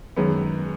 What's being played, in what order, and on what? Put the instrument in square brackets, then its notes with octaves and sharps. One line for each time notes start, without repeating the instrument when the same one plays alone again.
[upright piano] F#2 D#3 G#3 B3